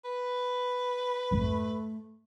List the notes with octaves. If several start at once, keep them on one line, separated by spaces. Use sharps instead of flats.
B4
B1 F2 G#2 A3